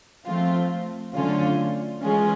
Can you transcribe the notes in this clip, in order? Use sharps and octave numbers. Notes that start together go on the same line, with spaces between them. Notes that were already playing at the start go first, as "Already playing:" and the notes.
F3 A3 C4 F4
D3 F#3 A3 C#4 F4
E3 G#3 C#4 F4 G#4